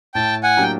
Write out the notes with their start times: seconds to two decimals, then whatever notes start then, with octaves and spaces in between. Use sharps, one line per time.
0.14 A2 G5 A5
0.43 F#5 G#5
0.57 F#3 A#3 D4 G4
0.63 G5